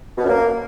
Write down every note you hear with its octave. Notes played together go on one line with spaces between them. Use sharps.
B2
F#2
A#3